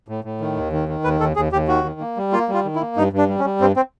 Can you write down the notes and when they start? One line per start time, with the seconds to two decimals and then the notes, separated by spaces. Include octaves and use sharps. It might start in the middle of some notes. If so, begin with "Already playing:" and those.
0.08 A2
0.24 A2
0.41 D#3
0.57 D#2
0.72 D#3
0.89 D#3
1.04 D#2 B4
1.20 D#2 A4
1.36 D#2 G#4
1.53 D#2 G4
1.68 D#3 F#4
1.84 D#3
2.00 A#3
2.17 G3
2.33 A#3 F4
2.49 G3 F4
2.65 D#3
2.75 E4
2.81 A#3
2.97 G2 D#4
3.13 G2
3.18 D4
3.29 G3
3.39 C#4
3.45 G3
3.60 G2 C4
3.76 C4